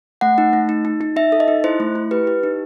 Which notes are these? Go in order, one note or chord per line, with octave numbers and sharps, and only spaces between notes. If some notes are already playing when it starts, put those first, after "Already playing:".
A3 F#5
D#4
A3
D#4
D#4
D#4
D#4 E5
A4
D#5
D#4
E4 C5
A3
E4
G4 B4
G4
D#4